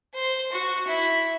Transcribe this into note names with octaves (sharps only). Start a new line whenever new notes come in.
C5
F#4
E4